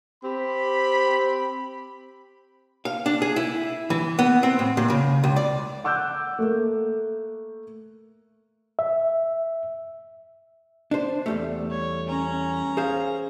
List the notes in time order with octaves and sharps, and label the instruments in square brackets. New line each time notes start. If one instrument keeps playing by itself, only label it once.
[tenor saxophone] C4 [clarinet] G4 [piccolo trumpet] B5
[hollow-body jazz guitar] F5
D4
G#4
E4
E3
B3
C4
A2
A#2
C#3
C#2
D5
[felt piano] F#5 D6 E6 F#6 G6
A3 A#3
[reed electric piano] E5
[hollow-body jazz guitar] D4 C5
E2 G3 A3
[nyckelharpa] C#5
C#4 A#5
[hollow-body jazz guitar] G#4 C5 F5